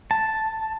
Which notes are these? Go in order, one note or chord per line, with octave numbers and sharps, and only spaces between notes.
A5